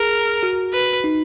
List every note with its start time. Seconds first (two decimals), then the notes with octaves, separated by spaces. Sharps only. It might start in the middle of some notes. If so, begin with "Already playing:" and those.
Already playing: G#4 A#4
0.43 F#4
0.74 B4
1.04 D#4